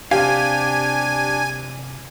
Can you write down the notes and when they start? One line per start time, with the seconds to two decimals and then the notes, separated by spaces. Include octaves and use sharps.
0.11 C3 D4 G4 F5 G#5